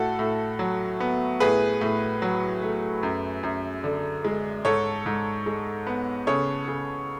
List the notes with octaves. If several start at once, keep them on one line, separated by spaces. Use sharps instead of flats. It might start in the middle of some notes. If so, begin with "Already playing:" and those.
Already playing: A2 F#4 A4
A2
F#3
B3
A2 G#4 B4
A2
F#3
A3
F#2
F#2
D3
G#3
G#2 A4 C#5
G#2
G#3
B3
C#3 A4 C#5
C#3